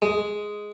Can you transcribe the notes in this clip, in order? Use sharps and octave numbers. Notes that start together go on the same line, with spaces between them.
G#3